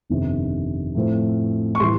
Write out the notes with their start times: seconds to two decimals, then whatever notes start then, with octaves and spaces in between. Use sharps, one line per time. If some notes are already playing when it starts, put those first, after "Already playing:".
0.10 G1 F2 C3 D#3
0.95 A2 F3 A3 C4
1.75 C#6
1.80 A2 E3 G3 C6